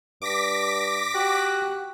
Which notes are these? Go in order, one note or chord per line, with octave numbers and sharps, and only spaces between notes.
G2 D6 A#6 B6
F#4 G4 F#6